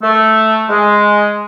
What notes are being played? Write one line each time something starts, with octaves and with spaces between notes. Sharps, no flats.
A3
G#3